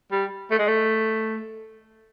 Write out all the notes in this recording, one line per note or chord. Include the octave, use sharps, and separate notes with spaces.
G3
A3
G#3
A3